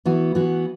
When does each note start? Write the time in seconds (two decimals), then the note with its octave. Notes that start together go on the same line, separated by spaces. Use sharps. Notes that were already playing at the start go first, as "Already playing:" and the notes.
0.05 E3 B3 F#4
0.35 E3 B3 F#4